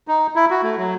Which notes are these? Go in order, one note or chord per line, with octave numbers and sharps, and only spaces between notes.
D#4
E4
F#4
A3
F#3